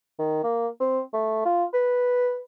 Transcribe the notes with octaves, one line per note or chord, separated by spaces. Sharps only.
D#3
A#3
C4
A3
F4
B4